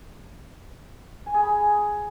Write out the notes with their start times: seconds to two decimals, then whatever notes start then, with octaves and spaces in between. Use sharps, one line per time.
1.26 G#5
1.34 G#4
1.43 B5